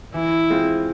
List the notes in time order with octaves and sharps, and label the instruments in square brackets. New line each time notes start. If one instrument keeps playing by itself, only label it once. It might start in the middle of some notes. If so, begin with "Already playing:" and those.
[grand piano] E3 [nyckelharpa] E4
[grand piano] G#3 C4 F4